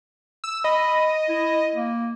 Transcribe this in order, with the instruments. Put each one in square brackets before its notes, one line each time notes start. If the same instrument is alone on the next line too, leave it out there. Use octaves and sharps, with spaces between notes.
[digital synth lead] E6
[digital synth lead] D#5 [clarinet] B5
[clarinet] E4
A#3